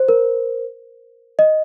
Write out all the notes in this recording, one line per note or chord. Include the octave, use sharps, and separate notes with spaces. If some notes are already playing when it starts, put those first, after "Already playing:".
Already playing: C5
A#4
D#5